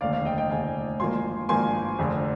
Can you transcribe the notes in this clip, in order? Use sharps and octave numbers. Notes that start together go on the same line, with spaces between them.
F1 D#2 D3 D5 F5
D5 F5
D#5 G5
D#5 G5
F1 D#2 D3 F5 G#5
G#1 G2 F3 A#3 G#5 C6
G#1 G2 F3 A#3 G#5 C6
F1 F2 D3